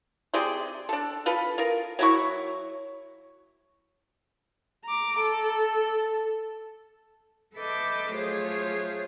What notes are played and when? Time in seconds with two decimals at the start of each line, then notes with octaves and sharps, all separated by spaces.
0.34 C3 G#4 D5 C6
0.89 D4 A4
1.26 F4 A4 B4
1.58 F4 A#4
1.99 F#3 E4 C#6
4.85 A#5 D6
5.18 A4
7.56 A4 B4 D#5 E5 D6 G6
8.15 F#3 A3 F4 G#4 C5 C#5